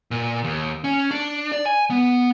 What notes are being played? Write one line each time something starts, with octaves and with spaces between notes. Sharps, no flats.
A#2
D#2
C#4
D4
D5
G#5
B3